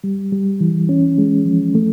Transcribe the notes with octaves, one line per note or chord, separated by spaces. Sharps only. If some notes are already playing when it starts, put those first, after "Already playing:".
G3
G3
E3
C#4
G#3
F3
A3